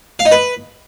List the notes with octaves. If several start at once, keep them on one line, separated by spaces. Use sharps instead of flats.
F5
D#4
B4